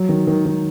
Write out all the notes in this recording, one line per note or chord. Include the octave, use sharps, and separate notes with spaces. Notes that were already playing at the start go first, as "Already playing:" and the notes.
Already playing: F#3
D#3
D#3
D#3